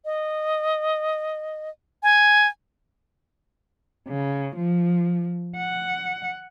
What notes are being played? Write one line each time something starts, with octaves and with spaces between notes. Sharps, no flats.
D#5
G#5
C#3
F3
F#5